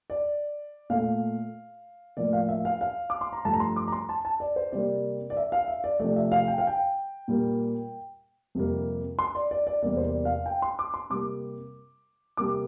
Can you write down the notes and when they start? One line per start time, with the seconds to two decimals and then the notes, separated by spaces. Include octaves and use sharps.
0.10 D5
0.90 A#2 A3 F5
2.17 A2 F3 A#3 D5
2.33 F5
2.49 E5
2.65 F5
2.81 F5
3.10 D6
3.21 C6
3.33 A#5
3.45 G2 F3 A3 A5
3.53 A#5
3.60 C6
3.76 D6
3.88 A#5
3.92 C6
4.09 A5
4.25 A5
4.40 D5
4.56 C5
4.72 C3 G3 A#3 D5
5.30 D5
5.37 E5
5.52 F5
5.68 E5
5.84 D5
6.00 C3 F3 A3 D5
6.16 E5
6.32 F5
6.48 G5
6.58 F5
6.67 G5
7.28 A#2 G3 A#3
8.55 F2 C3 G3 A#3
9.19 C6
9.35 D5
9.51 D5
9.67 D5
9.82 E2 C3 G3 A#3 D5
9.97 C5
10.04 D5
10.25 F5
10.46 G5
10.62 C6
10.79 D6
10.94 C6
11.10 C3 G3 A#3 D6
12.37 C3 G3 A#3 D6